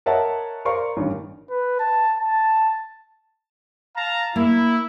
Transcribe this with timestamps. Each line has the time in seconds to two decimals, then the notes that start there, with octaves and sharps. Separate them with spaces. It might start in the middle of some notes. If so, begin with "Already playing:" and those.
0.06 A#4 C#5 D#5 E5 F#5 A5
0.65 A#4 C5 D5 F5 C6 C#6
0.97 A1 G2 D#3
1.50 B4
1.79 A5
2.20 A5
3.96 F5 A5 A#5
4.36 A#3 E4